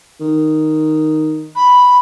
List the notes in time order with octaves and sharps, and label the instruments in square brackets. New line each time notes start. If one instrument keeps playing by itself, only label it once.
[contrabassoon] D#3
[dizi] B5